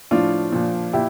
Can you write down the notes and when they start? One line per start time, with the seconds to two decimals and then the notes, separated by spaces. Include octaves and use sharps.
0.11 A2 F3 D4 F4
0.52 A#2 F3
0.93 A#2 E4 G4